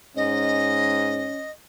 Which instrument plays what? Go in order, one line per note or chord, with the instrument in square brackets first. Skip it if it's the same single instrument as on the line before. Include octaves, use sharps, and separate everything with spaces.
[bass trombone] G#2 [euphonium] C#4 [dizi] D#5